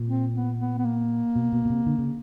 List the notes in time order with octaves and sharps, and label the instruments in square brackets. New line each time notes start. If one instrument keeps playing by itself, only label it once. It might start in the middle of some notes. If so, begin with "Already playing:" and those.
Already playing: [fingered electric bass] A#2
[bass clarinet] C4
B3
B3
B3
A#3
[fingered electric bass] B2
B2
B2
C3
D3
C#3